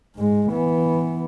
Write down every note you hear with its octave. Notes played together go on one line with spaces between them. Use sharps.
G#2 G#3
E3 B3